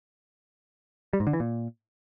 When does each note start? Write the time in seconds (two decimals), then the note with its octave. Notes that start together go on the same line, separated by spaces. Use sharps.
1.13 G3
1.20 G#2
1.27 D3
1.33 E3
1.40 A#2